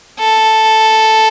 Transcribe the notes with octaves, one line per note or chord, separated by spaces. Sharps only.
A4